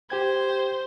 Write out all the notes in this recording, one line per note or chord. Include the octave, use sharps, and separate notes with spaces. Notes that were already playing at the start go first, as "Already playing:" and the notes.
G4 C5 G5 G#6